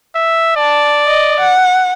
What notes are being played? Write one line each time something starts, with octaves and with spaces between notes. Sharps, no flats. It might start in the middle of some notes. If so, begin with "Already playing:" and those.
E5
D5 A5
D#5
F#5